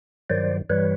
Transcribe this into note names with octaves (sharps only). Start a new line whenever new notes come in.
G2 D#3 F#3 C5 D5
G2 E3 G3 B4 C#5